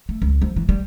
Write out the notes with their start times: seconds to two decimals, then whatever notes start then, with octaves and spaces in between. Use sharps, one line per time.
0.09 A3
0.22 C#2
0.42 F3
0.56 E3
0.69 G3